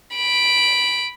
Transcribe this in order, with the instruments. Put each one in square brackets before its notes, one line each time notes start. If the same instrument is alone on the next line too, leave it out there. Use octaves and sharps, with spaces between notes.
[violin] B5 D7